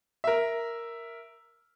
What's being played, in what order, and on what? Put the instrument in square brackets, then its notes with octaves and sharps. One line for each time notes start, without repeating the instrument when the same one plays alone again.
[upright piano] A#4 E5